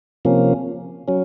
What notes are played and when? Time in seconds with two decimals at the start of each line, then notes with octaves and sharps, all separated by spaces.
0.25 C3 F3 A#3 C#4
1.08 F#3 C#4